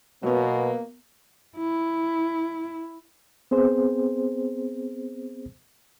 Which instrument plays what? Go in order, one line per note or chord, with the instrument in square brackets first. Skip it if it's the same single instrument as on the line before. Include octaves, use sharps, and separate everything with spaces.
[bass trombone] B2 [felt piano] F#3 B3 [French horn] A#3
[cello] E4
[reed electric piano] B3 C4 G#4 C5